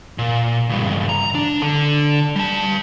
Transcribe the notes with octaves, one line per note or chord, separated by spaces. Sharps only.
A#2
C#2 G2
A#5
D4
D3
G3 A5